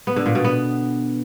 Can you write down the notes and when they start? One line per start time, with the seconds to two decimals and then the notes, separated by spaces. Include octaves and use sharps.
0.07 B3
0.16 D3
0.26 A#2
0.35 B2
0.44 B3